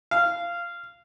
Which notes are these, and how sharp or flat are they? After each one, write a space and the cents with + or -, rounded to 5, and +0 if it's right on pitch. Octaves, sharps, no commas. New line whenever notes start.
F5 -15